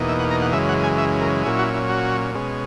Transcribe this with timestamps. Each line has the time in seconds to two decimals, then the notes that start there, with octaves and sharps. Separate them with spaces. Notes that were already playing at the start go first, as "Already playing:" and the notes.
Already playing: E2 B2 A#3 D#4
0.08 E5
0.19 F#5
0.31 A#5
0.42 F#5
0.53 F#2 C#3 E3 G#3 E5
0.69 F#5
0.84 G#5
0.98 E5
1.21 A#4
1.44 A#2 F#3 C#4 E4 G#4
1.59 F#4
1.74 E4
1.90 F#4
2.35 B2 G#3 C#4